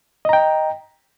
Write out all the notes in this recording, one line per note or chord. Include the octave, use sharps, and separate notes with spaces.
D#5 G5 A#5